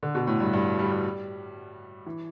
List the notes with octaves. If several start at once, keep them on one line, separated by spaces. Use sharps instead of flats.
D3
B2
A2
G2
G2
G3
G3
E3